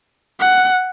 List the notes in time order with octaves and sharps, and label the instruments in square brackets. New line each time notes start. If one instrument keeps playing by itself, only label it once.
[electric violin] F#5